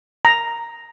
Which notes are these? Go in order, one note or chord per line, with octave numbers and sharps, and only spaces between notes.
A#5